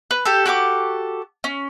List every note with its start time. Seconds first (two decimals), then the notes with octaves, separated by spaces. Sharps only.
0.11 B4
0.25 G4 A4
0.46 F#4 G4 A4 D6
1.44 C#4